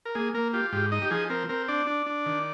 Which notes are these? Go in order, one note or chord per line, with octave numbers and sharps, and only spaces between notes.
A#4
A#3 G#4
A#3 A#4
F4 G4
G#2 G4
D#4 D#5
G4
F3 G#4
C4 A#4
C4 A#4
D4 D5
D4
D4
D#3